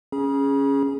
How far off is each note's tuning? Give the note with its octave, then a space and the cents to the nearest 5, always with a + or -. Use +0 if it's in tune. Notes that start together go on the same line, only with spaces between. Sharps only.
C#4 +0 G#4 +0 B5 -45